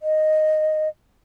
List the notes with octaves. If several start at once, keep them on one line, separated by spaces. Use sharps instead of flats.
D#5